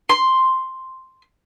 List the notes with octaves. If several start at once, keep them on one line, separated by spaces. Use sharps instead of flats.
C6